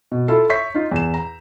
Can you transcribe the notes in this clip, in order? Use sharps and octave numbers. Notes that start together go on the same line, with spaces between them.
B2
E4 F4 A4
C#5 E5 C#6 G6 B6
D#4 F4
E2 E7
A#5